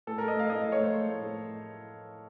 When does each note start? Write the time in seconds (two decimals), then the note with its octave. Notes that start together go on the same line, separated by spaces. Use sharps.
0.07 A2 A4
0.18 A3 A#4
0.28 D#5
0.36 A3 F5
0.50 A2 D#5
0.65 A2
0.72 C#5
0.78 A3 C5
0.94 A3
1.08 A2
1.22 A2